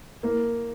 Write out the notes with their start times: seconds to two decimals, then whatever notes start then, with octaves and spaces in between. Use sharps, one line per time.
0.23 A#3